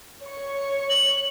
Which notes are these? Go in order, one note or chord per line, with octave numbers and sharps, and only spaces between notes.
C#5 C#6
F#7